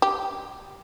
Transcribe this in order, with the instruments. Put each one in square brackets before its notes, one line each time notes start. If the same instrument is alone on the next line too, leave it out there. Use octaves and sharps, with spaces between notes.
[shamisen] G4